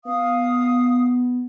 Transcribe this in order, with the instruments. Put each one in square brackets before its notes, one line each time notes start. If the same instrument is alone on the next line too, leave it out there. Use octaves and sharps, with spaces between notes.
[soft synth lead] B3 [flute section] F5 D#6